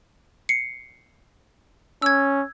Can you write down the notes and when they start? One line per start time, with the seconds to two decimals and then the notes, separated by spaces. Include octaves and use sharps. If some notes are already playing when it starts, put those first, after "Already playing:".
0.49 C7 C#7
2.02 C#4 E6 G#6